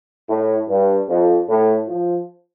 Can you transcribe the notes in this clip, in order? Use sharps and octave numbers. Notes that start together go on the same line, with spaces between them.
A2
G2
F2
A2
F3